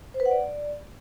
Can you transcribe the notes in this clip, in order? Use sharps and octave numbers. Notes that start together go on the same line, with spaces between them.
C5
B4
F#5
D5